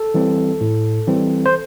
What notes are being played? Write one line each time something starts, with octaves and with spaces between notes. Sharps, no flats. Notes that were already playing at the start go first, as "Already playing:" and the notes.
Already playing: A4
E3 G3 C4
A2
E3 G3 C4
C5